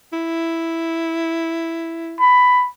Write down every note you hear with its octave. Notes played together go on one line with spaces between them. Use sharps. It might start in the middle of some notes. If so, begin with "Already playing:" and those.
E4
B5